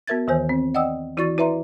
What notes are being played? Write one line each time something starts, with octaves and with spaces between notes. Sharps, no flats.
B3 F#4 A#4 E5 G#6 A6
D#2 D#3 E3 C5 G#5 G6
C4
D5 D#5 F#5 G5 D#6 E6
E3 E4 F#4 D5 C#6 A6
E4 B4 D5 E5 A#5 C6